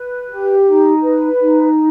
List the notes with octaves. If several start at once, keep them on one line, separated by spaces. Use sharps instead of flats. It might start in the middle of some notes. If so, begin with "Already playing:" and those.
Already playing: B4
G4
D#4
B4
D#4